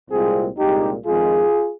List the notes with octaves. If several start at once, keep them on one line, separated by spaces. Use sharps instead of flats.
C2 A#2 G#3 C4 F4 G#4
C2 A#2 G#3 D#4 G4
F2 D#3 G#3 F4 G#4